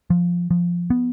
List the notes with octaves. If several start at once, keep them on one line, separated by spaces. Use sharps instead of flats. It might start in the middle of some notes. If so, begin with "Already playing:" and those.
F3
F3
B3